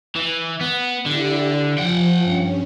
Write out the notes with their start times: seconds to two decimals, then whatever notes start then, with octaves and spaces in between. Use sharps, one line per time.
0.16 E3
0.61 B3
1.06 D3 E4 G4 D5
1.78 F3 F#5 G5
2.23 G2 C#4